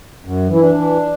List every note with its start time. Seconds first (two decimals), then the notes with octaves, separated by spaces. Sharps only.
0.25 F#2
0.49 E3
0.55 E4
0.62 D4
0.74 E3